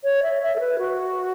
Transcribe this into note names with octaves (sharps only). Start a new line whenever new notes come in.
C#5
E5
E5
A4
B4
F#4